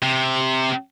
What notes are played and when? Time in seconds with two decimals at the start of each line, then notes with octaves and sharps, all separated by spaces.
0.02 C3